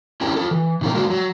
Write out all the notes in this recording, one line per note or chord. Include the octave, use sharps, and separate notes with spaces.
C#4 D4 E4 G4 A#4 C#5
F4 A4
E3
A#2 D#3 E3 C4 A#4
G#3 A#3 D4 F#4
F#3